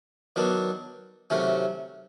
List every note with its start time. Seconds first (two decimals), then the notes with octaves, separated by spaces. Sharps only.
0.36 D#3 F#3 B3 D4
1.30 C3 D#3 F#3 A3 C#4